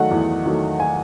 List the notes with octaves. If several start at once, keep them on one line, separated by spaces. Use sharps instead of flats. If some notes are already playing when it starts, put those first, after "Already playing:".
Already playing: D#3 F#3 A3 D#5 F#5
E2
D#3 F#3 A3
G#5